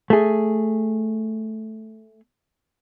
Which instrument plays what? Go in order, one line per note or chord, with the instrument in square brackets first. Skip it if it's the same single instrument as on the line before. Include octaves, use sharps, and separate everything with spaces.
[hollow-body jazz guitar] A3 G#4